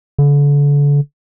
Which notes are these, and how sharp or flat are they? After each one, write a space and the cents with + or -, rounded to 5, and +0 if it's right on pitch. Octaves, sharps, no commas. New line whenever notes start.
D3 -35